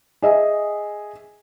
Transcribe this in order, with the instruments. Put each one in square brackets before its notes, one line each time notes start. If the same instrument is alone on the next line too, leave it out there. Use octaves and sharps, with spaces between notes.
[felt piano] G#4 D#5 E5 G#5